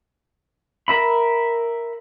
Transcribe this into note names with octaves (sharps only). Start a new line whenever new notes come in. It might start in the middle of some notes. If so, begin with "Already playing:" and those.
A#4 E5 B5